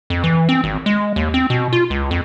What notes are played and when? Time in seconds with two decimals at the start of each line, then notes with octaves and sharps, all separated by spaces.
0.10 F2
0.24 E3
0.49 C4
0.64 G#1
0.86 G#3
1.16 D#2
1.34 C4
1.50 B2
1.73 F4
1.90 C#2
2.11 F2